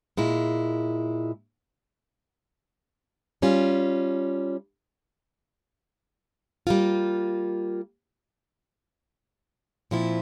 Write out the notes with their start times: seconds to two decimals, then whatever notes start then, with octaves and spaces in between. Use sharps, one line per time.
0.17 A#2 G#3 E4
3.42 G3 C#4 F4
6.67 G3 A#3 F4
9.91 A#2 F3 C4 E4